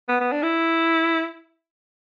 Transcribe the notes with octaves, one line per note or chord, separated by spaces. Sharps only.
B3
B3
D4
E4